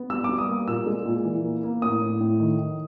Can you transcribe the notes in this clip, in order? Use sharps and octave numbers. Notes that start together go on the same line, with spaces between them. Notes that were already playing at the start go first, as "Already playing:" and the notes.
Already playing: B3
G3 E6
G3 D6
D#6
A#3
A#2 E6
G#3
A#2
E3
A#3
A#3
A2 D#6
A2
A2
D#3
D#3